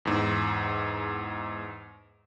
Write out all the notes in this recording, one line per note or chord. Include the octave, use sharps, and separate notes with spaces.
E2 G#2